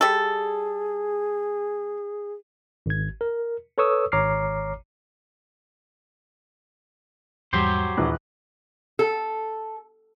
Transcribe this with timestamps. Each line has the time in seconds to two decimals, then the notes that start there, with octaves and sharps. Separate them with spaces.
0.01 G3 G#4 A4
2.86 G#1 G#6
3.21 A#4
3.78 A4 B4 C#5 C#6 D#6 E6
4.12 G#1 C#5 A#5 D6 F6 C7
7.53 E2 G#2 F#3 G3 G4 C5
7.97 A#1 D#2 E3 F#6
8.99 A4